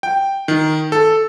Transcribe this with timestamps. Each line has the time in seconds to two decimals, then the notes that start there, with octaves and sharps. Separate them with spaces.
0.03 G5
0.48 D#3
0.92 A4